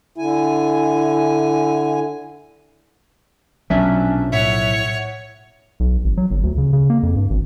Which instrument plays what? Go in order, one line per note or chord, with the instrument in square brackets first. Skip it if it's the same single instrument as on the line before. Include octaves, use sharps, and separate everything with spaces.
[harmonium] D3 G#5 [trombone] E4
[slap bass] B1 A#2 F3 [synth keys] F#3 C#4 E5 [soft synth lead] D4
[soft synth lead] A2 [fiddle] C#5 [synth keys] E5 F#5
[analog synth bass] B1
G#1
F#3
G1
D2
C#3
C#3
A#3
F2
G2
G#1